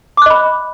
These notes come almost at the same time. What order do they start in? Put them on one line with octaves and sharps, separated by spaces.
D6 F#6 D#5 B5